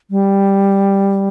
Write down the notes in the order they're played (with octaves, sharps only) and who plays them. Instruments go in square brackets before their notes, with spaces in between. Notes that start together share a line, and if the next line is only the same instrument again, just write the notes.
[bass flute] G3